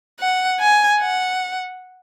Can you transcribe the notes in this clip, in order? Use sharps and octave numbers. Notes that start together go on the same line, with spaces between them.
F#5
G#5
F#5